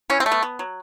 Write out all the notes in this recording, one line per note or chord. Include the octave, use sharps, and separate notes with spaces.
E3 C#4
C4
A3
B3
B3
F#3